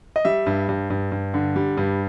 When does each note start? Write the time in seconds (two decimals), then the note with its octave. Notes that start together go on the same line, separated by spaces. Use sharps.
0.16 D#5
0.25 G3 E5
0.46 G2
0.69 G2
0.90 G2
1.12 G2
1.34 D3
1.56 G3
1.77 G2